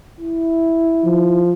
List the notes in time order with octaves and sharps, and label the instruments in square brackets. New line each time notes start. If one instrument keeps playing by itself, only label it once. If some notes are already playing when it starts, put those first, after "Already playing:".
[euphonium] E4
[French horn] F3